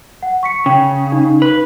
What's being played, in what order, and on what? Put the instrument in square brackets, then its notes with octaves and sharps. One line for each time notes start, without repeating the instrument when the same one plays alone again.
[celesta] F#5
C#6 B6 C#7
[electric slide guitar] C#3 [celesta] G5
[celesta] D#4
[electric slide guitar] B4